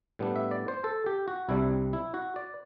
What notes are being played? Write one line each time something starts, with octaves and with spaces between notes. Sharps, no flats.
A2 G3 B3 D4
E5
D5
C5
A4
G4
F#4
C2 C3 G3 D4 E4
E4
F#4
D5